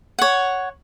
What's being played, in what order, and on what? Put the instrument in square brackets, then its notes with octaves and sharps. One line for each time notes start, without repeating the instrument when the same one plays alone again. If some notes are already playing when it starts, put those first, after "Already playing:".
[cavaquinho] C#5 F#5